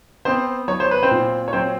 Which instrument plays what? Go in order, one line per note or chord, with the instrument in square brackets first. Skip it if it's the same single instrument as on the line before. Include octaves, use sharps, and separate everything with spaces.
[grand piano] B3 C4 C5
F#3 C#5
C5
B4
C4 C5
A#2
C#5
F#3 C4 C5